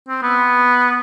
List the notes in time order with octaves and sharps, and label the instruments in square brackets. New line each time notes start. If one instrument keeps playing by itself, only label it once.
[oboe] C4
B3